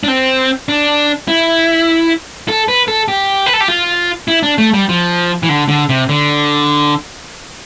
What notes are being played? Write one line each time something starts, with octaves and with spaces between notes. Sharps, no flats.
D4
C4
D4
E4
A4
B4
A4
G4
B4
A4
G4
F4
E4
D4
A3
G3
F3
E3
D3
D3
C3
D3